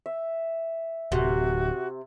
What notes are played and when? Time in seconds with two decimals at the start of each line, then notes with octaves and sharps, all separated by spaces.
0.06 E5
1.12 D1 C3 F#4